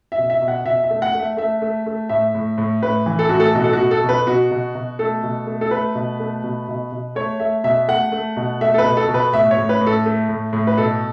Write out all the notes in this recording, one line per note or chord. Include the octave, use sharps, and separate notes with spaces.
E5
B2
E5
B2
F#5
B2 E5
E5
A3
F#5
A3
E5
A3 E5
A3
A3
A2 E5
A2
A2
A2 B4
E3
A4
A2 F#4
A4
B2 F#4
A4
F#4
B2
A4
B2
B4
B2 F#4
B2
B2
A3 A4
B2
A3
A4
A3 B4
B2
A3
B2
B2
B2
A3 C#5
A3 E5
B2 E5
A3 F#5
A3
B2
A3 E5
A4
B4
B2
A4
B2
B4
A2 E5
C#5
A2
B4
A2
A4
A3
A2
A2
B4
B2 A4